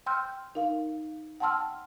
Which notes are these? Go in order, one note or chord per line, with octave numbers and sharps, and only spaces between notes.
G5 C6 E6 F6 G6
D#4 A#4 F5
F#5 G5 A5 C6 E6 F6